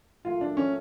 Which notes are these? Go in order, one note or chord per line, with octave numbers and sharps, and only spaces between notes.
A#2 F#3 A3 F4
D4
C#4